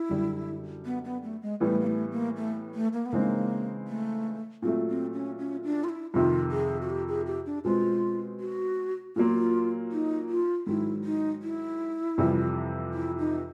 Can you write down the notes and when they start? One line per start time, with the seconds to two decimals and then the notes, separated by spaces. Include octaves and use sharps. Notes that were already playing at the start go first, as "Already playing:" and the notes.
Already playing: E4
0.10 F#2 D3 G3
0.85 B3
1.05 B3
1.23 A3
1.42 G#3
1.60 A2 E3 G3 A3 B3
1.80 A#3
1.87 A3
2.12 A#3
2.36 A3
2.75 A3
2.93 A#3
3.06 B3
3.12 C#3 E3 G#3 A#3 C4 D#4
3.88 A3
4.62 A#2 F#3 A3 C4
4.89 C4
5.14 C#4
5.39 C#4
5.64 D4
5.84 F4
5.89 E4
6.13 F2 C3 D#3 F4
6.51 G#4
6.82 F#4
6.90 G4
7.08 G#4
7.27 G4
7.46 D4
7.64 B2 G#3 C4 F4
8.40 F#4
9.16 A#2 F#3 A#3 F4
9.92 D#4
10.29 F4
10.67 G#2 D#3 F#3 E4
11.04 D#4
11.42 E4
12.18 F2 C3 E3 G3
12.94 E4
13.19 D#4